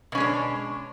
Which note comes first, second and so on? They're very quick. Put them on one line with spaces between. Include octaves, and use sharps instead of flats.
B2 C#4 G#3 D4